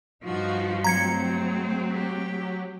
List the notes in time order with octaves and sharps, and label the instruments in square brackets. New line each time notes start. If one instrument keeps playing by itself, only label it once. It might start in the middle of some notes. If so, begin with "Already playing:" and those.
[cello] G2 F3 [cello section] D#4 F4 F#4
[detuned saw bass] F#3 [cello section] G#3 A3 C4 [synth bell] A#5 G#6 C#7
[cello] G4